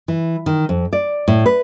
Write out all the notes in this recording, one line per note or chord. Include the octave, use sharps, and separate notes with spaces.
E3
D#3
F2
D5
A2
B4